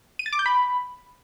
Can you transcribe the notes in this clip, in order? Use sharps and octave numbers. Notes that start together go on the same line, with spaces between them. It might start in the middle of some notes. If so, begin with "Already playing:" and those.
D#7
A6
D6
G6
B5